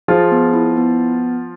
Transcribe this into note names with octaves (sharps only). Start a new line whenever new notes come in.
F3 F4 G#4
B3
E4
B3